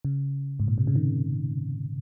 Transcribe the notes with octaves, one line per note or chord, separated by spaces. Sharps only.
C#3
G#2
A#2
C3
C#3
D#3